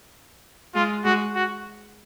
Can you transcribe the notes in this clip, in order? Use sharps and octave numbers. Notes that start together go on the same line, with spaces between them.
G#3 F4
G#3 F#4
F#4